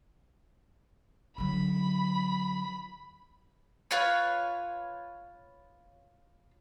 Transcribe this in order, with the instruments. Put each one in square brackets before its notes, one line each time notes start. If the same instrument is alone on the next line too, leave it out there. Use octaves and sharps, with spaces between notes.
[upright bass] D3 F#3 [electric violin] B5
[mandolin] F4 B4 C#5